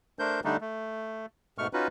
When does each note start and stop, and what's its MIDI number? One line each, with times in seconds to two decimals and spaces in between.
0.19 0.40 57
0.19 0.40 62
0.19 0.40 70
0.19 0.40 72
0.19 0.40 91
0.44 0.57 50
0.44 0.57 55
0.44 0.57 57
0.44 0.57 62
0.44 0.57 63
0.61 1.26 57
1.58 1.67 44
1.58 1.67 47
1.58 1.67 57
1.58 1.67 85
1.58 1.67 89
1.73 1.88 61
1.73 1.88 63
1.73 1.88 65
1.73 1.88 66
1.73 1.88 71